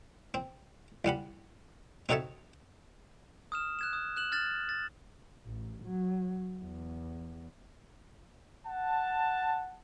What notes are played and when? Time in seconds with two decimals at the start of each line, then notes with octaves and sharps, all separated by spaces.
0.34 C4
1.05 A1 G3 F#5 B5
2.09 C4 D#4 F#4 A4 C#5 E5
3.52 D#6 F6 E7
3.79 F#6 G#6 E7
3.93 D#6
4.16 F#6 E7 F#7
4.32 F6 G#6 A6 E7 F#7
4.69 A6
5.46 A1
5.84 F#3
6.61 E2
8.68 F#5 A5